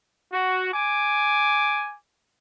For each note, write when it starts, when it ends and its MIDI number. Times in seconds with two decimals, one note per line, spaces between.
0.32 0.73 66
0.74 1.95 80
0.74 1.95 86